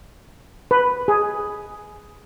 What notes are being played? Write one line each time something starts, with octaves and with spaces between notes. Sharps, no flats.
B4
G#4